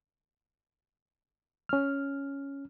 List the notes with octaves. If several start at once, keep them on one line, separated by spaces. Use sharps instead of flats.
C#4 F6